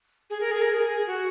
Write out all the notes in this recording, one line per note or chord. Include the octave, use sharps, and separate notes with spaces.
G#4
A#4
G#4
A#4
G#4
F#4